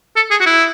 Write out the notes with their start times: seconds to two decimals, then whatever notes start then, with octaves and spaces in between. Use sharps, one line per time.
0.16 A4
0.31 G#4
0.40 F#4
0.46 E4